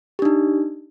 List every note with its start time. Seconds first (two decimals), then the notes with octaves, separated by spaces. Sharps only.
0.19 G4
0.22 D4
0.25 D#4